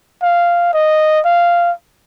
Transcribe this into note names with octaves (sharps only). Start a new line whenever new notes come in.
F5
D#5
F5